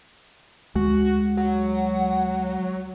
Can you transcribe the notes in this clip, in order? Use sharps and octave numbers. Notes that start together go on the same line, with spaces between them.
D2 G#3 F#4
F#3 F#5